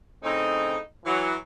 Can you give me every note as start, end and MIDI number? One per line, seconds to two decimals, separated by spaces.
0.24 0.77 45
0.24 0.77 49
0.24 0.77 60
0.24 0.77 63
1.05 1.34 52
1.05 1.34 54